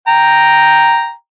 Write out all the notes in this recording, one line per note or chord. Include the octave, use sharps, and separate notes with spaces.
G5 A#5